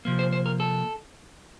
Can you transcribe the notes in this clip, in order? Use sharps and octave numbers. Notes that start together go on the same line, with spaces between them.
C3 F3 A#3
C5
C5
A#4
A4